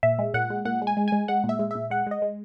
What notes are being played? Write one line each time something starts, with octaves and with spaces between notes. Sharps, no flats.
A#2 E5
G#3
A#2 F#5
G#3
A#2 F#5
G#3
G#5
G#3
G#3 G#5
G#3 F#5
A#2
E5
G#3
A#2 E5
G#3 F#5
G#3 D#5
G#3